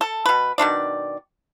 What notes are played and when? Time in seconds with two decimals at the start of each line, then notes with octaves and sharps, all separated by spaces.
0.01 A4
0.26 B2 B4
0.58 B2 D#3 D4 D5